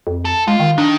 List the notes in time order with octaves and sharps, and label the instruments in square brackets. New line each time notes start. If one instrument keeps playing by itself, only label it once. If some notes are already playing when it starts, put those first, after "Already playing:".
[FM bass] F2
[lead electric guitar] A4
[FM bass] G#3 [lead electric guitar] F4
[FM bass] D#3
[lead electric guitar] D#3 [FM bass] D4